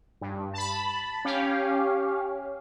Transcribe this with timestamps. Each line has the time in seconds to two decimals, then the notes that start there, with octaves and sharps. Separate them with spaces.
0.21 G2
0.53 A5 B5
1.25 C#4 G4 F5